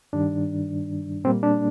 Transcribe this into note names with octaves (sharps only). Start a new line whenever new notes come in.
G2 D#3 G3 D4
A#2 G3 A#3 C4
D4